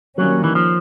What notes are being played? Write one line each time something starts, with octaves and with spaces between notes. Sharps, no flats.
D#3 F#3 G3 A#3 C#4
E3
F3